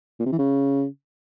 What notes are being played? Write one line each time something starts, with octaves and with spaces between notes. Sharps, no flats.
A#2
C3
E3
C#3